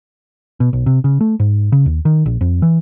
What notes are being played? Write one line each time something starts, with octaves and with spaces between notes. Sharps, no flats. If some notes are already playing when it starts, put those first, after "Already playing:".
B2
B1
C3
C#3
A3
G#2
C#3
D#2
D#3
A#1
F2
E3